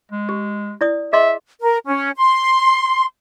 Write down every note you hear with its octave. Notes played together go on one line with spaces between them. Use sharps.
G#3
G4
E4 D5 D#6
G#4 D#5 E5 C6
A#4
C#4
C6